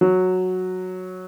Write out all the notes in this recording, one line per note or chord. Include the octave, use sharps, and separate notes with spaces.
F#3